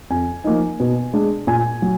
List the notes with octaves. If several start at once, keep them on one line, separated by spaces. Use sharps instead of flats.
F2 G#5
F3 A#3 D#4
B2
G#3 D4
A#2 G#5
F#3